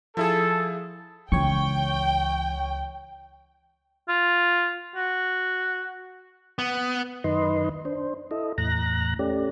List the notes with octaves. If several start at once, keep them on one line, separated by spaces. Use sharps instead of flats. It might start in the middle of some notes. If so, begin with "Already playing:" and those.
F3 E4 G#4 A4
C#2 E3 C#5 G5 C#6
F4
F#4
B3
F#2 D#3 D#4 B4 D#5 C6
D4 C5
E4 A4 D#5
E2 A2 A#5 F#6 A#6
A3 C#4 G4 D5